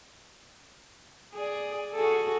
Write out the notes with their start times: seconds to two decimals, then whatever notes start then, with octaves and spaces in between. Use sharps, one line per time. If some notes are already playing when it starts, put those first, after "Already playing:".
1.34 G#4 D5
1.93 F#4 G#4 A4